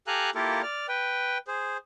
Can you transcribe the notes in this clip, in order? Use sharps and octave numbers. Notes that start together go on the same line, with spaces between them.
G4 A4 F5 G#5 A#5 F#6
A#3 E4 F4 G4 A4 A#4
D5 F6
B4 G5
G#4 C5